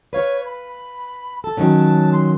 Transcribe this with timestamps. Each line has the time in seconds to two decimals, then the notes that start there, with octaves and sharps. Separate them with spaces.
0.13 B4 C#5 F5
0.45 B5
1.44 A4 A5
1.57 D#3 F#3 C#4
2.12 C6